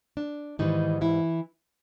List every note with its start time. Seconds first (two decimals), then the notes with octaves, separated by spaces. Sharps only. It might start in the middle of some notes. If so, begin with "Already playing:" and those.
0.17 D4
0.59 G#2 D#3 E3 G3 D#4
1.01 E3 E4